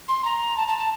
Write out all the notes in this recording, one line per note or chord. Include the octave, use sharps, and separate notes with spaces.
C6
A#5
A5
A5
A5